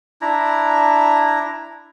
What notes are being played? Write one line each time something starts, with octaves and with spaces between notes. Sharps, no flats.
D4 E4 A#5